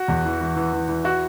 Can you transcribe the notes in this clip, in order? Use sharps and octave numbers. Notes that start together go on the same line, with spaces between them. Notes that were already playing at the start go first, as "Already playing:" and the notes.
Already playing: F#4
E2
E3
E3
E3
E3
E3
E4 F#4